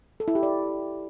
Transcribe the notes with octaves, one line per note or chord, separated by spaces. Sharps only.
A4
E4
G4
D5